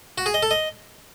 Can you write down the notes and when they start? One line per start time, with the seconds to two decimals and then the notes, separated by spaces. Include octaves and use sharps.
0.18 F#4
0.26 G#4
0.34 D#5
0.42 A4
0.51 D#5